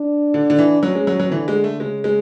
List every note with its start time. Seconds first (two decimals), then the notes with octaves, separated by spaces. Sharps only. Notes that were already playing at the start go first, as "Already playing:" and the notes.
Already playing: D4
0.34 D3
0.50 D3
0.59 E3
0.83 F#3 C#4
0.95 G#3
1.07 F#3
1.20 F#3
1.32 D3 E3
1.48 G#3
1.64 A3
1.80 C#3 G#3
2.04 G#3